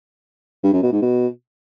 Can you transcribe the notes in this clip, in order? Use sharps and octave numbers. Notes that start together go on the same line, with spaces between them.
G2
F#2
B2
G#2
B2